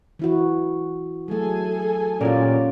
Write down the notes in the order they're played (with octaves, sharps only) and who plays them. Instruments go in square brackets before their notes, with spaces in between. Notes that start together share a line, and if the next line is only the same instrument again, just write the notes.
[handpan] E3 E4 F#4
[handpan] F#3 A3 [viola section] G#4 A4 G#5
[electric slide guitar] A#2 G4 A#4 [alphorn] C#4 [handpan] F4 D5